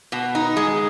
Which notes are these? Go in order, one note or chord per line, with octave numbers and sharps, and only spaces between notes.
B2
D#4
G#3